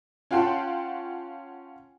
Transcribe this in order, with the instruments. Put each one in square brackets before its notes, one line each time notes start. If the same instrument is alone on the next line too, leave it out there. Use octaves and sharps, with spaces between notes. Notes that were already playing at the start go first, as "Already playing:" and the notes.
[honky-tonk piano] C#4 F4 F#5 G5 A5 C6